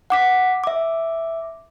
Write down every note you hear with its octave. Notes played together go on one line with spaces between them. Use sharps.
F#5 D6 B6
E5 D6